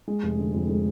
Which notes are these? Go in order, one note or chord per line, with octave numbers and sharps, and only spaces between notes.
G#3
F1
D3
F2
G#3